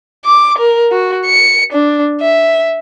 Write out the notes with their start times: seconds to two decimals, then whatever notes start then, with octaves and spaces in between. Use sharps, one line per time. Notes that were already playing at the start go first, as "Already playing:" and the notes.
0.25 D6
0.58 A#4
0.92 F#4
1.26 C#7
1.73 D4
2.21 E5